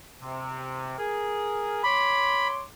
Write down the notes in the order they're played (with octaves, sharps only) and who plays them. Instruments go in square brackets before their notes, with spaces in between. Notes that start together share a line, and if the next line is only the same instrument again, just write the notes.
[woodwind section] C3
G#4 A#4
[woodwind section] C#5 C6 D6 [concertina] B5